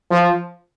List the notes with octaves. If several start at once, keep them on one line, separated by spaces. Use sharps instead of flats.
F3